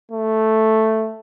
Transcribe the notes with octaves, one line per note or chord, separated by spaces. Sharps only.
A3